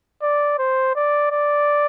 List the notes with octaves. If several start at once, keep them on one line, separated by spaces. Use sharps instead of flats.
D5
C5
D5
D5